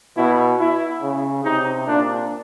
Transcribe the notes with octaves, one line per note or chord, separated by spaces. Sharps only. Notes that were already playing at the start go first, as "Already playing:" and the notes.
B2 E4
E4
C#3
C3 D#4
A#2 D4